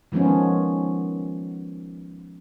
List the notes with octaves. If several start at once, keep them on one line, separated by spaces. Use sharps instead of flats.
D#3 F3 G#3 B3 C#4